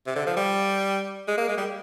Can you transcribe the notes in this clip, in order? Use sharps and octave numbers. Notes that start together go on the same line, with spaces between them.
C3
D3
F3
G3
G#3
A#3
G#3
G3